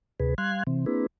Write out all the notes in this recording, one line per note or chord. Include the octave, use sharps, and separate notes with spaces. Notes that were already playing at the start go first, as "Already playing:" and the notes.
D2 C3 G#4 B4
G3 F5 C6 F#6 G#6
C3 E3 C4
A#3 C4 D4 E4 G#4 B4